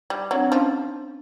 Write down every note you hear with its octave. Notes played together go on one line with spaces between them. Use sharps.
G3
F#3 C4 D4
D4
F3 C#4 D#4